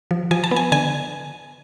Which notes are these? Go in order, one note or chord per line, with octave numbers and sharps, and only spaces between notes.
F3
F3 G#5
A5
B3
G#5
D3 G#5